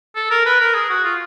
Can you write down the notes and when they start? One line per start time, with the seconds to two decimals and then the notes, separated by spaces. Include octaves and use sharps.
0.15 A4
0.31 A#4
0.46 B4
0.60 A#4
0.74 G#4
0.90 F#4
1.04 F4